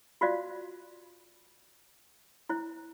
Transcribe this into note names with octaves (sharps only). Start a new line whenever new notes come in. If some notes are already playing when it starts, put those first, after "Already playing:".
F4 F#4 C5 D5 F5
E4 C5